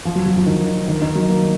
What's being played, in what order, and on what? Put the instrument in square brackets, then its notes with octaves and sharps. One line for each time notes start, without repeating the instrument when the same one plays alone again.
[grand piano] F3
F#3
F#3
F3
D#3
D#3
D#3
F#3
A#3